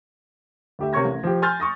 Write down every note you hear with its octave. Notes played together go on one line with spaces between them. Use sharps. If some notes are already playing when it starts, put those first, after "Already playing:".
D2 G4 E5
C3 A#4 C#5 C#6 G#6 A#6
A1
F3 G4
G#5 C6 F6 G6 A6
C#6 D#6 A#6